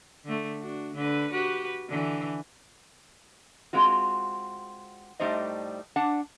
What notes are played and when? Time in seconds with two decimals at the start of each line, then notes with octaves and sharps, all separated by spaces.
0.25 D3 A3
0.61 D4 F#4
0.95 D3 B4
1.32 F#4 G4 B4
1.88 D3 E3
3.73 G#3 C4 F4 F#4
5.20 A2 G3 A3 D#4 C5 D#5
5.96 D4 F#5 A5